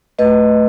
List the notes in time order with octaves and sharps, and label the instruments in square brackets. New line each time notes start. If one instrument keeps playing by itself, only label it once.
[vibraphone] A3 B4 D#5